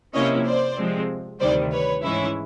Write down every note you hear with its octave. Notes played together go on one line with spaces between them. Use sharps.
C3 F3 A#3 C#4 E4 C#5 D#5
C5 D5
C3 F3 G#3 C4
D2 C3 D#3 G3 C5 D5
B4 C#5
G#2 E3 G#3 C#4 E4